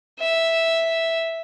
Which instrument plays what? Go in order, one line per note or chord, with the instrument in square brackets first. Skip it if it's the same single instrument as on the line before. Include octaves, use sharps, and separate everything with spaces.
[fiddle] E5